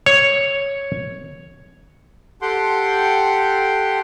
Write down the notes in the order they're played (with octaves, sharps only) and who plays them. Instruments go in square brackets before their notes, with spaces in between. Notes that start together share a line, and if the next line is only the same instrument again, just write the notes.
[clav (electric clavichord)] C#5
[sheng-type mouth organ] G4 A4 F#5 G5 C6